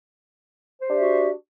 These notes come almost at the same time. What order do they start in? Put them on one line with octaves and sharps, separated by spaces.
C5 G4 D4 E5 F#4